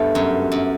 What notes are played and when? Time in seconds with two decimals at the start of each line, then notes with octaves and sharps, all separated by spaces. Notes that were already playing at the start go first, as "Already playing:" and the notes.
Already playing: G2 A3 B3
0.15 F#2
0.52 F#2